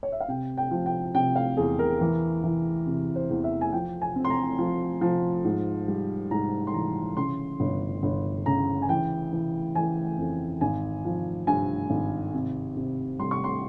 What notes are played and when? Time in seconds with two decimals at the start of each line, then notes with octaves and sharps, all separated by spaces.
0.03 C#5
0.12 E5
0.20 F5
0.28 C3 G5
0.58 G5
0.71 F3
0.86 G5
1.15 C3 G5
1.36 F5
1.57 E2 G#4
1.79 A#4
2.01 E3
2.44 E3
2.87 C3
3.16 C5
3.30 E2
3.44 E5
3.61 G#5
3.72 F3 G5
4.02 G#5
4.16 C4
4.25 C6
4.30 A#5
4.59 F3
5.01 F3
5.45 G#2
5.88 G3
6.31 G#2 A#5
6.67 C6
6.74 E3 A#5
7.17 C#3 C6
7.60 G1
8.03 G1
8.46 C#3 A#5
8.82 G#5
8.89 E3 G5
9.33 E3
9.75 E3 G#5
10.18 F2
10.61 G#1 G#5
11.05 F3
11.47 G2 G#5
11.90 G#1
12.34 C3
12.77 C3
13.19 G3 C6
13.31 C#6
13.44 C6